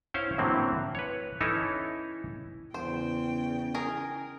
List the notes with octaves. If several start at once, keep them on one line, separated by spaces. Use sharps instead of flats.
C#4 E4 C5 C#5 F5
A2 D3 E3 F#3 A#3 C4
B4 C#5
E3 C#4 D#4 E4 A4 C#5
E2 C#3 C5 G5
G#4 A#4